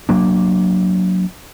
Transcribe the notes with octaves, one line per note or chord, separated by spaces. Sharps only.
F#3 A#3 D4